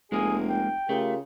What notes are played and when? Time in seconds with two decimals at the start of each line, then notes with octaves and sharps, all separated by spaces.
0.12 F1 G#3 A#3 G#4
0.49 G5
0.89 C#3 A3 F4 G4 A#4